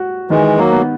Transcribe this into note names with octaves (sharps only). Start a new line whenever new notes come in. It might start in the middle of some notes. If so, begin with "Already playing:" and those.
Already playing: F#4
D#3 E3 G#3
F#3 A#3
B3